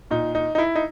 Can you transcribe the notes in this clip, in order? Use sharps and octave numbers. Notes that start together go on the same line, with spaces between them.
A#2 D#4
D#4
D#4
E4
D#4